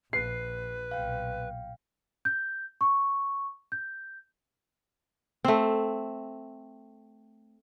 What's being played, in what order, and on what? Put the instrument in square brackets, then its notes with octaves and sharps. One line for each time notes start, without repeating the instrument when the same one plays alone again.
[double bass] A#1 [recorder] B4 [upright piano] C7
[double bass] B1 A#2 [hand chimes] F5 G5
[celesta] G6
C#6
G6
[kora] A3 C4